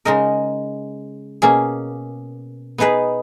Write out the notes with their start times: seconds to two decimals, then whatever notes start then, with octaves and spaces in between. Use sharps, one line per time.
0.05 C#3 G#3 D#4 A#4 D#5
1.42 B2 A#3 C#4 G#4
2.78 B3 D#4 G#4 B4